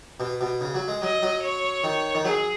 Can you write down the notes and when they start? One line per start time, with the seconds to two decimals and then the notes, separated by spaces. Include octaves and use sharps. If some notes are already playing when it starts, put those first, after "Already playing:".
0.20 B2
0.41 B2
0.61 C#3
0.75 F#3
0.88 G#3
1.02 F#3 D#5
1.22 F#3
1.42 C#5
1.84 D#3
2.15 D#3
2.25 F#3 G#4